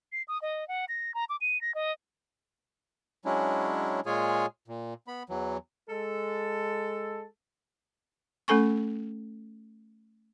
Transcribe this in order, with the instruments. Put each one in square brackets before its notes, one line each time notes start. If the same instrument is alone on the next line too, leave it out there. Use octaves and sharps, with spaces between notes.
[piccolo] C7
D#6
D#5
F#5
A#6
A#5
D6
D#7
A#6
D#5
[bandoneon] F#3 G#3 C#4 D4 E4
A#2 G#3 F4 G#4 C#5 G#5
A#2
B3 B5
E2 E3 F#3
[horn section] G#3 A4
[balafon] A3 C#4 A4 G#5 C#6